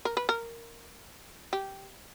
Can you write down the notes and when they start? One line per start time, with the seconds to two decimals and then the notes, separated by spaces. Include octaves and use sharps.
0.05 A#4
0.17 B4
0.29 A#4
1.53 G4